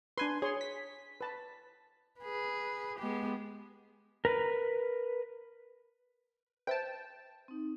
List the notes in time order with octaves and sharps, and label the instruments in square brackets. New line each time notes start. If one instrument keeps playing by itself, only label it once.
[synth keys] D4 G#5 C6 [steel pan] B4
[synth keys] G#4 [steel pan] C#5 C6
[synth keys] B6
[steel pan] B4 A5
[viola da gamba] G#4 B4
G#3 B3 G4
[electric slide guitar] A#4 B4
[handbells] B4 C5 E5 [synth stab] G5 A5
[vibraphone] C4 D#4